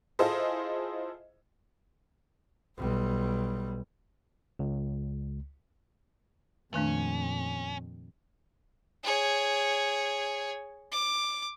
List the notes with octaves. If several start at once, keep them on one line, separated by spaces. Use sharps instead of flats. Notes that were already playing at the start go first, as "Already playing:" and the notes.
E4 F4 G#4 A4 C5 D#5
B1 G3
C#2
F2 A#2 D#3 A3 C#4 D4
G#4 C#5
D6